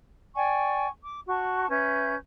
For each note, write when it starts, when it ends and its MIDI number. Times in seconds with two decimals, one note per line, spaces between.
0.35 0.87 74
0.35 0.87 79
0.35 0.87 80
0.35 0.87 85
1.03 1.21 86
1.28 1.68 66
1.28 1.68 81
1.28 1.68 85
1.70 2.15 61
1.70 2.15 71
1.70 2.15 76
1.70 2.15 91